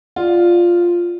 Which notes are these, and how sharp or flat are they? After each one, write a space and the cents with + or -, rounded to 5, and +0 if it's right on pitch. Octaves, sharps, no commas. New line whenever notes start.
F4 +0 D5 +10